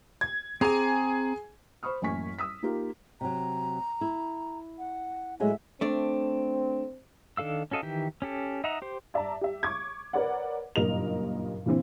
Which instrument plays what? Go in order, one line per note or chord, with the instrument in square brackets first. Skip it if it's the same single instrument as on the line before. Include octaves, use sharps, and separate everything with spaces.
[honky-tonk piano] G#6
[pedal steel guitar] C4 A#5 D6 [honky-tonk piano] G#4 G#5
[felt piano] C5 B5 C#6 D#6 F6
A1 F#2 A#3 G#5 C#6 B6
D#6 E6 B6
A#3 D#4 F4 G4 A#4
[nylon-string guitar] C3 F#3 [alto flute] A#5
[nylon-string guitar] E4
[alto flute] F#5
[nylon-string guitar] A2 F#3 G#3 [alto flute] E5
[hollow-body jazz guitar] A3 D4 [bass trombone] C4
[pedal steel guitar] D#3 D4 A4 F5 E6
C#4 F#4 A4 D#5 F5
D#3 E3 G4
C#4 G4 A4
D#4 D#5 E5 F#5 A#5
G4 C5
[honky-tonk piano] D5 E5 A5 A#5
G4 E5
C#6 D6 G#6
A#4 B4 C#5 D5 F#5
F#1 G2 A#2 A#4 D#5 F7
A#2 D3 E3 C4